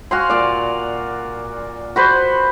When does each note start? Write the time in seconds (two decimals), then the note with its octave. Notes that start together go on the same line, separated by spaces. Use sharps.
0.11 F#4 F5 G#5 C6
0.30 A#2 D5
1.96 F#4 B4 C5